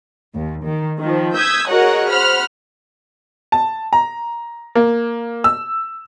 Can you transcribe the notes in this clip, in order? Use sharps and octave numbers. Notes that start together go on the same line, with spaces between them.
D#2
D#3
D#3 F3
D#6 E6 G6 G#6 B6
F#4 G#4 A#4 C#5 D#5 F#5
C5 F#5 B5 F6
A5
A#5
A#3
E6